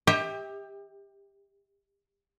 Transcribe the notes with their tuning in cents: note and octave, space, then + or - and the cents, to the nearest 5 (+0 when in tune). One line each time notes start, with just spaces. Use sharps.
G4 +20 E5 -40 G5 +35